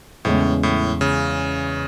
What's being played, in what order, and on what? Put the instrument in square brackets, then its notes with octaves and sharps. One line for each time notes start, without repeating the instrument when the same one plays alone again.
[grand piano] E2 C#3 G#3 C#4 [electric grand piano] A2
[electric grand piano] A2
C#3